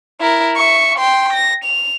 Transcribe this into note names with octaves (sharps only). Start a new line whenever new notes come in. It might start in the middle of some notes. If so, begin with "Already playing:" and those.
E4 A#4
E5 C#6
G5 C6
A#6
F7